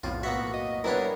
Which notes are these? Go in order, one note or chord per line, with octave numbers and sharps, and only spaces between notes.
B1 F2 A2 F4
A#3 B3 F#4 E5
D#5
G3 B3 D4 E4 A#4 B4 C#5